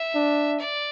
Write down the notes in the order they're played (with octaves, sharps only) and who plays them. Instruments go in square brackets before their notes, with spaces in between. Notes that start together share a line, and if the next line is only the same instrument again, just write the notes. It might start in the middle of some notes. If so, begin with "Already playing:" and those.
Already playing: [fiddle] E5
[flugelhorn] D4
[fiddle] D5